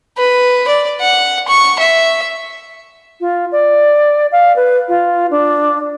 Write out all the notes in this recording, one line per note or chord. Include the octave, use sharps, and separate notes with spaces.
B4
D5
F#5
C#6
E5
F4
D5
F5
B4
F4
D4